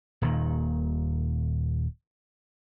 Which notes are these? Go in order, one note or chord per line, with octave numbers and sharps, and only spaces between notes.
D#1 D#2 A#2 D#3